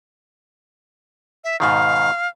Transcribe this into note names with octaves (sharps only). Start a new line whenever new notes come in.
E5
G#2 B2 D#3 F5